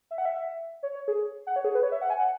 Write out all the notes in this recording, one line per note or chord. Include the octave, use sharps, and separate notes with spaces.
E5
F#5
E5
C#5
C#5
G#4
F#5
C#5
G#4
B4
C#5
E5
F#5
G#5
F#5